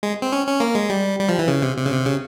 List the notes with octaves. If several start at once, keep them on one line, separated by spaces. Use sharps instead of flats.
G#3
C4
C#4
C#4
A#3
G#3
G3
G3
F3
E3
C#3
C3
C3
C#3
C3
C#3